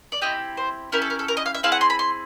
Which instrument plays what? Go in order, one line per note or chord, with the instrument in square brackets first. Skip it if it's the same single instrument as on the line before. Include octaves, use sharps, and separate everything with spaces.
[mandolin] D5
C4 E4 G4 D#5
C5
C#4 E4 G4 A#4
A4
A#4
A4
A#4
D#5
F5
E5
C4 E4 G#4 F5
F#5
C6
B5
C6